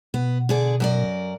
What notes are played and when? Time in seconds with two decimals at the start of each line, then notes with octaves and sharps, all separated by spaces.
0.14 B2 B3
0.49 D3 G#4 D5
0.80 F#2 A#4 D5